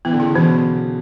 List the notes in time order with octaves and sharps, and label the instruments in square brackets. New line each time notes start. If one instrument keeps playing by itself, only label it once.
[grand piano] E3 [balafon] B3
[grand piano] D3
[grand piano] C#3 [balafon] E4
[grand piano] B2 [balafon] E3